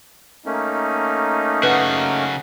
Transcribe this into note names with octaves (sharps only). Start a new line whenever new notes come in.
A3 A#3 C#4 D#4
C#3 F#4 B4 F#5